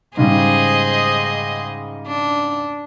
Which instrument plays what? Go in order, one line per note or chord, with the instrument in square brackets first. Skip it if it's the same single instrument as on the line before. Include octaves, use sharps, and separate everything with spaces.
[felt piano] G#2 C#3 G3 [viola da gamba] G#4 C5 D#5
[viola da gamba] D4